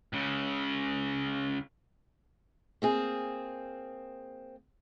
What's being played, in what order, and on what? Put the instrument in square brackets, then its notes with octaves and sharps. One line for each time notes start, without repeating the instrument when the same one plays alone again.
[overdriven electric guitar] C#2 C#3
[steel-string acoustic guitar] A#3 C4 G#4